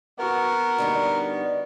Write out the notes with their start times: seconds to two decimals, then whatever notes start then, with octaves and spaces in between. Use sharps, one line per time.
0.19 B3 F#4 A#4
0.78 D3 G3 D#4